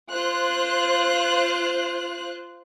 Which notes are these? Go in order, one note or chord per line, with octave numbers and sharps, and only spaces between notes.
F4 C5 F#6